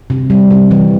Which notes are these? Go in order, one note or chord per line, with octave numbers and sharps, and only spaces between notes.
C3
G3
C3
E3